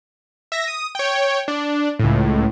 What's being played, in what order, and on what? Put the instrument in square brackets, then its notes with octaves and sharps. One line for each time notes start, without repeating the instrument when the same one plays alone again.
[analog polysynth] E5 A#6
D#6
C#5 G5
D4
C#2 A2